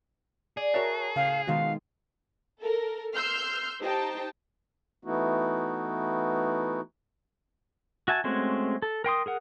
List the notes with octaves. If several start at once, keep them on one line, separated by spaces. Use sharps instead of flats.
G#4 D5
F#4 A#4 C#5 E5 A5
A2 C#3 F5 G5
B2 D#3 F3 G#3 F#4 F5
A4 A#4
C6 E6 F6 G6 C7
D#4 G4 C5 G5 A5
E3 A3 B3 D#4 E4 F#4
F#4 E5 G#5 A5
G#3 A3 C4 C#4 F#4
A4
A#4 G5 C6 D#6
G#4 A#4 F#5